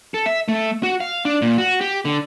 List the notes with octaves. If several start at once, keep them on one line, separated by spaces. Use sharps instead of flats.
A4
E5
A3
F#4
F5
D4
A#2
F#4
G4
D3